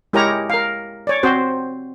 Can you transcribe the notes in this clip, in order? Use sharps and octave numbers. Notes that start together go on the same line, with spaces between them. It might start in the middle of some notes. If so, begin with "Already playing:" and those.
G#3 E4 G4 A#4 C#5 A#5
A#4 F5
C#5 D5
C4 F#4 C5